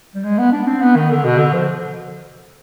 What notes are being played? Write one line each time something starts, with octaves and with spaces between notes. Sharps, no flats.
G3
G#3
B3
D4
C4
B3
D#3
D3
B2
D3
F3